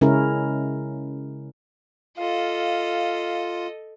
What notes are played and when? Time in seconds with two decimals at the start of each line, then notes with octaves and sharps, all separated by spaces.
0.01 C#3 G#3 C#4 E4 A#4
2.18 F4 A4 D#5 F5